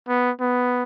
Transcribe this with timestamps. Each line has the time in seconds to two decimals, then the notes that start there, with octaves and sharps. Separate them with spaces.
0.08 B3
0.40 B3